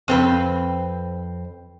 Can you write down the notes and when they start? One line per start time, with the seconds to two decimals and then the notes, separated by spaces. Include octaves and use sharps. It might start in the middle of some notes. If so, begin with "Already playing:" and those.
0.08 F2 C4 B4